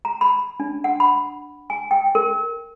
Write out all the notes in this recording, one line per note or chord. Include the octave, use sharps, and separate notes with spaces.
A#5
B5
D4
F#5
B5
G#5
G5
A#4